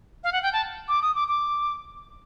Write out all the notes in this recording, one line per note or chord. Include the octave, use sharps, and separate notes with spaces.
F5
F#5
G5
A5
D6
D#6
D6
D6